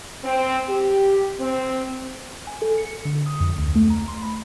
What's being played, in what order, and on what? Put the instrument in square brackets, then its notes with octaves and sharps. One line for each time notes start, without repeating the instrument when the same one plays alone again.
[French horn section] C4
G4
C4
[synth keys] G#5
A4
C#7
D3
D#6
F2
D2
A3
A#5
C6
B5